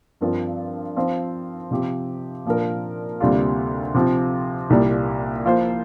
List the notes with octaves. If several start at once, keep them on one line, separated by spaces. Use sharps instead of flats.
G2 F3 C4 F4 A#4
F3 C4 F4 C5
C3 F3 C4 G4
A#2 F3 D4 A#4
D2 C3 G3 A#3 F4
C3 F3 C4 F4
C2 A#2 G3 A#3
F3 A#3 F4 C5